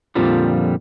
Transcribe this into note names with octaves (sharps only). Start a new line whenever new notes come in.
F2 A#2 D3 F3 G3